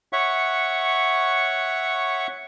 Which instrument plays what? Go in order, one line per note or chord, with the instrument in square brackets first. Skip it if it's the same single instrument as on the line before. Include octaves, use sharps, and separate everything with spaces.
[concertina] C#5 E5 F#5 C#6